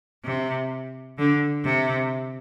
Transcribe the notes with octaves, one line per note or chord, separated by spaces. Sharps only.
C3
D3
C3